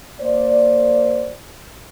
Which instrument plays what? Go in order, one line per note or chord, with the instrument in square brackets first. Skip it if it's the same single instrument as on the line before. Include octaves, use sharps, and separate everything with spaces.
[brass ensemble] A#3 C5 D5